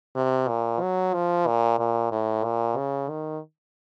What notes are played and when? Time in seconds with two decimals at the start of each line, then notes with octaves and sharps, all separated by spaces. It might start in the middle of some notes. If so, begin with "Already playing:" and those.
0.15 C3
0.48 A#2
0.81 F#3
1.14 F3
1.46 A#2
1.79 A#2
2.12 A2
2.44 A#2
2.77 C#3
3.09 D#3